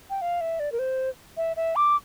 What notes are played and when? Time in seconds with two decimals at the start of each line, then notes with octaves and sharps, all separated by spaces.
0.10 G5
0.21 F5
0.41 E5
0.60 D5
0.72 A#4
0.79 C5
1.37 E5
1.56 E5
1.76 D6